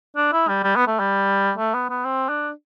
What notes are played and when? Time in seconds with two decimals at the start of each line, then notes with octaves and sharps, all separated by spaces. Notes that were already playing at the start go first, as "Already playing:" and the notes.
0.17 D4
0.33 E4
0.48 G3
0.64 G3
0.76 B3
0.88 A3
1.00 G3
1.58 A3
1.74 B3
1.90 B3
2.05 C4
2.29 D4